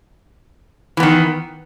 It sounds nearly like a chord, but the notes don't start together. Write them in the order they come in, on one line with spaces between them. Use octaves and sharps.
E3 B3 D#3